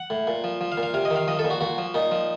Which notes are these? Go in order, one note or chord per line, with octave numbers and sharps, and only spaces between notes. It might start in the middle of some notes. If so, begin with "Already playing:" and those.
Already playing: F#5
A2
A#2
F3
F3
F5
A#2
F5
C3 F5
D#5
D#3
F5
F3 D#5
A4
A#2
F#4
A#2 F#4
F3
A#2 D#4
F3